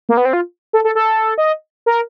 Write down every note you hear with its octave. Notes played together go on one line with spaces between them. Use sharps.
A#3
B3
C4
F4
A4
A4
A4
D#5
A#4